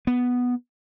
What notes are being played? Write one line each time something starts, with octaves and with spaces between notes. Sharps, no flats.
B3